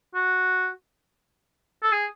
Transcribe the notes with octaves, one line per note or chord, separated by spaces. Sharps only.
F#4
A4
G#4